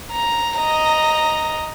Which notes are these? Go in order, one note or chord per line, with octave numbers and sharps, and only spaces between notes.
A#5
D#5 A#5